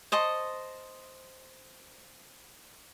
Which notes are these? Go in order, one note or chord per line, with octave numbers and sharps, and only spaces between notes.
C5 D#5 A5 C#6